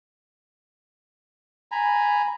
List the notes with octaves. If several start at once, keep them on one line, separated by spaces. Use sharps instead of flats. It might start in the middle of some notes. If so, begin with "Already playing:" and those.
G#5 A#5 B5